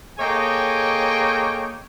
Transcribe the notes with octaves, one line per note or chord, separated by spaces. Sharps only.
A#3 G#4 A4 C#5 D#5 G5